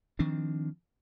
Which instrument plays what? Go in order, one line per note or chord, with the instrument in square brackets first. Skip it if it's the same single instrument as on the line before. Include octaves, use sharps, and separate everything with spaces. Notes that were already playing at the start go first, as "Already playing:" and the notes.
[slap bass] D#3 F3 C4 D4